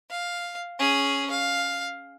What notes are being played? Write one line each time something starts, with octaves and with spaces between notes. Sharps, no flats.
F5
C#4 G#4
F5